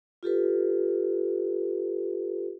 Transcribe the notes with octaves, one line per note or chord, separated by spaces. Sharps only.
F4 G4 A4 B4